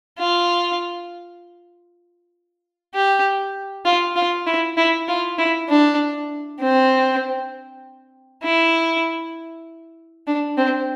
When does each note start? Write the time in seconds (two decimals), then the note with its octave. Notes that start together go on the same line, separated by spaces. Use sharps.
0.19 F4
2.94 G4
3.85 F4
4.16 F4
4.47 E4
4.77 E4
5.08 F4
5.38 E4
5.69 D4
6.61 C4
8.44 E4
10.27 D4
10.57 C4